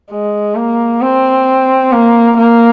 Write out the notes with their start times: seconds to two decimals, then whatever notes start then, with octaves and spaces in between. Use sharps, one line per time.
0.11 G#3
0.55 A#3
1.01 C4
1.92 A#3
2.38 A#3